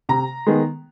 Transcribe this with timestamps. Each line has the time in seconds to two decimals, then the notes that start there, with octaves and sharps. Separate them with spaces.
0.09 C3 A#5
0.47 D#3 G#3 B3